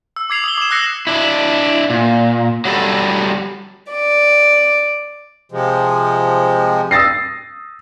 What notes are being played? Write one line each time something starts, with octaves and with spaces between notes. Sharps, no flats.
E6
D6 G#6 C7 F7
D#6 F#7 G7
D6 E7
E6 F#6 A#6 C7 C#7
D4 E4
A#2
F#3 G3 A4
D5
C3 F3 G#3
D#6 E6 A6 A#6 C7